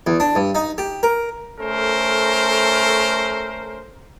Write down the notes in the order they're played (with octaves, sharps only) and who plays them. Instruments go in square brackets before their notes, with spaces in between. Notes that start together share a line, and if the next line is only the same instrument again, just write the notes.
[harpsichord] E2
D4
G2
D#4
G4
A#4
[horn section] A3 C#4 A4 A#4 C5